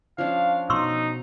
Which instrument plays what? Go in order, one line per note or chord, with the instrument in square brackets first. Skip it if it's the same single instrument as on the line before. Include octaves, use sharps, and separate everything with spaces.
[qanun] F3 C#4 D4 [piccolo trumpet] F5
[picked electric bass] B2 [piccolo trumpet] D#4 [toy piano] C6 C#6 E6